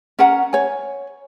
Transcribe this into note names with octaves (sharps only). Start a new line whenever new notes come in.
C#4 A#4 F#5 A#5
C#5 G#5